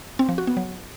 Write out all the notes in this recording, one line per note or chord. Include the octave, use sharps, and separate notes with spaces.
C4
F3
F#4
B3
F#3